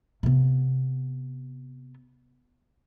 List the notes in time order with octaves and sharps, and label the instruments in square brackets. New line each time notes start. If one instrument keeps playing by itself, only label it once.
[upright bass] C3 B3